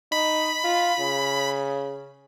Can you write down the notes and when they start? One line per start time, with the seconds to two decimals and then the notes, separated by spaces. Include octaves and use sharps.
0.12 D#4 B5
0.64 F4
0.99 C#3